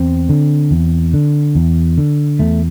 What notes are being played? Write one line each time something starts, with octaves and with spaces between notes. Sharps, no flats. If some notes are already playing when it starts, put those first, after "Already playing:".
Already playing: E2 C4
D3
E2
D3
E2
D3
E2 A3